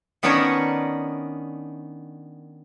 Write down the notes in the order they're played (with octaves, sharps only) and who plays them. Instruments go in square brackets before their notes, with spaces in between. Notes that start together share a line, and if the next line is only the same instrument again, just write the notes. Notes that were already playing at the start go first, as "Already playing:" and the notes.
[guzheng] D#3 B3 C#4 D4 A#4 C#5